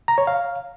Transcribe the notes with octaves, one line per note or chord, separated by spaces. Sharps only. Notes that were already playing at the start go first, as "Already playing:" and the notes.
A#5
C#5
F5